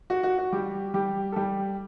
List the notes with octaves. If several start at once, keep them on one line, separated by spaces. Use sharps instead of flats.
F#4
F#4
F#4
G3 G4
G3 G4
A4
G3 G4